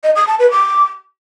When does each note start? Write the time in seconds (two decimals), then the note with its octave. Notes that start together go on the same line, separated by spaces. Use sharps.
0.04 D#5
0.15 D#6
0.27 A5
0.39 B4
0.51 D6